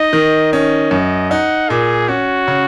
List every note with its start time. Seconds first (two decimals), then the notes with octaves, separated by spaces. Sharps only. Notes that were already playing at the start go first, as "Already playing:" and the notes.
Already playing: D#4 D#5
0.13 D#3
0.53 C#4 D#5
0.91 F#2 D#5
1.31 D#4 F#5
1.70 A#2 G#4
2.08 C#4 F#4
2.48 C#3